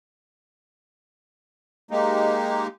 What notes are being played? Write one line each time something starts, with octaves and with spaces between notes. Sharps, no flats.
G#3 A#3 D#4 G4